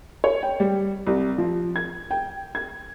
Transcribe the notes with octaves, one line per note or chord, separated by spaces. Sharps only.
C#5
G5
G3
C2
F3
G#6
G5
G#6